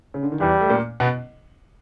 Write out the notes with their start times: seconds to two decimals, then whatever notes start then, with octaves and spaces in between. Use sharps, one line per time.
0.14 C#3
0.23 D3
0.32 D#3
0.40 E2 E3 G3
0.61 A3
0.69 A#2 A#3
1.00 B2 B3